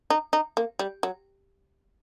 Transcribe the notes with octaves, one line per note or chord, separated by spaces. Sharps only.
D#4
D#4
A#3
G3
F#3